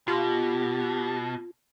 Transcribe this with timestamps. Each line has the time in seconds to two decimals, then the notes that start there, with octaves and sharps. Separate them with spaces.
0.08 B2 F4 G4